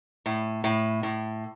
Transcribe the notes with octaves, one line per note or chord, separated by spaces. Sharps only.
A2
A2
A2